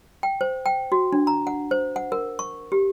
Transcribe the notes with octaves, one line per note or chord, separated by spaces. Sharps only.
G5
C5
G5
F#4
D4
A#5
F#5
C5
F#5
A#4
C#6
G4